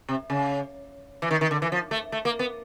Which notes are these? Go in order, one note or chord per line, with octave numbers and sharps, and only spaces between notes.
C3
C#3
E3
D#3
D#3
D3
E3
F3
A3
A3
A#3
B3